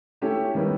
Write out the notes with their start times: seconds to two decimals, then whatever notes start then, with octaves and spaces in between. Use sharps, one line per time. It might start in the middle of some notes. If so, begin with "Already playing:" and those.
0.22 A3 C#4 E4 G4
0.55 D#3 G3 B3 E4